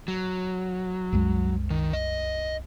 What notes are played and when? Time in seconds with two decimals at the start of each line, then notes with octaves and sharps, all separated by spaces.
0.08 F#3
1.12 C2 F#2 G#3
1.70 D#3
1.93 D#5